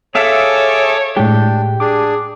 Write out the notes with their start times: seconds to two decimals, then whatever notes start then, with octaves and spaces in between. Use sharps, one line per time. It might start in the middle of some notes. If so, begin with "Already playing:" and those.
0.15 G#4 A4 C#5 E5 F5 D6 E6
1.17 A2 G#3 D4 G4 G5
1.80 D4 G#4 D6